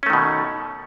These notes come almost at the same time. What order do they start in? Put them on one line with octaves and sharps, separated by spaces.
C#4 A3 D#3 B2